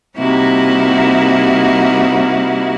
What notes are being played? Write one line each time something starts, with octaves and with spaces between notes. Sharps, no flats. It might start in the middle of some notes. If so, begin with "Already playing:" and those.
C3 G3 A#3 D#4 E4 F#4